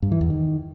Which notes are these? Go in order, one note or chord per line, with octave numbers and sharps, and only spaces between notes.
G2
E3
E2
D#3